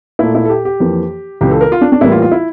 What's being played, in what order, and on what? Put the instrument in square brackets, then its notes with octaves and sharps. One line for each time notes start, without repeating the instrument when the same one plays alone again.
[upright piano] A#2 A3 E4
E4
A4
G4
G4
F2 E3 A#3
C#2 C#3 E3 G4
A4
A#4
F4
D4
D4
A2 E3 G3 A#3 E4
F4
F4
E4